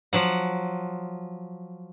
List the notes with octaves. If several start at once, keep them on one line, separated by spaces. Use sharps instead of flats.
F3 F#3 F#5